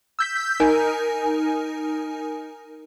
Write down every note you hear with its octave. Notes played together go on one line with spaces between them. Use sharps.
E6 G6 B6
D#4 A#4 G#5